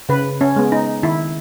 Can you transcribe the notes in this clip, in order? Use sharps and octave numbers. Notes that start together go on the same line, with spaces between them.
C#3 B4
C#4
G#3 B3
D#4
D#3 E4